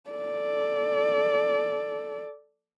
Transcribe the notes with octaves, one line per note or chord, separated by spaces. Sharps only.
A4 D5